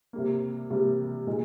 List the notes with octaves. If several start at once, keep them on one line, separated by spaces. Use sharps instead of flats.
C3 G3 A#3
C3 G3 A#3
A#2 G#3 D#4 G#4